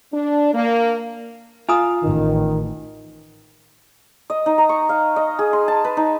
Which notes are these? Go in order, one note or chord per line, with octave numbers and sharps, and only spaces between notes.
D4
A#3
F4 F5 G#5 A#5 D#6
A1 D#3
D#5
D#4
A#5
C#6
F5
D#5
G#4
C6
A5
B4
D#4